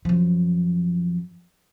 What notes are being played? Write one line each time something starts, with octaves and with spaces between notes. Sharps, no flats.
F#2 F3